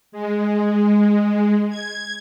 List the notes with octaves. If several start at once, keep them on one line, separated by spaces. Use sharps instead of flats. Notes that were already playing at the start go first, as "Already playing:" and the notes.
G#3
G#6